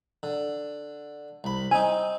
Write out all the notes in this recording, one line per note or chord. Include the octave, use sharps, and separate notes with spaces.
D3
C2 B5
C4 D#4 G#5